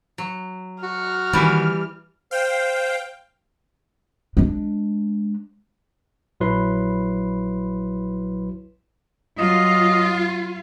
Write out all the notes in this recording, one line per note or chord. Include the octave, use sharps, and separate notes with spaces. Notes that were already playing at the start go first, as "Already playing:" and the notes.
F#3
F#4 F6
D#3 E3 G3 A#3
C5 F5 G5
G#3 D4
A#1 F#3 E4 B4 C6
F#3 F4 D#5